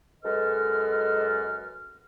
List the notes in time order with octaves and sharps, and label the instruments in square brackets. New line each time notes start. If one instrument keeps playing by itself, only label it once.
[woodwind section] F#2 G#3 A4 B4 D#5 F6